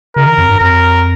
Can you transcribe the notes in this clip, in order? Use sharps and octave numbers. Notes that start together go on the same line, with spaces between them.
C#3 A#4
D#3
F2
G2
F2 A#4